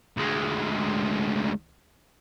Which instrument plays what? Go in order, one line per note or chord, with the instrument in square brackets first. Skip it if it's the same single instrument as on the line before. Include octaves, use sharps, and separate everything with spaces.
[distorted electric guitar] D2 G#3